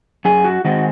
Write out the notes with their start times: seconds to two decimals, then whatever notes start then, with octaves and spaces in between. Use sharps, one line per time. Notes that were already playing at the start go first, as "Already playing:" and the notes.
0.25 F#2 G#4
0.44 F#4
0.65 D#3 G#3 C4 F#4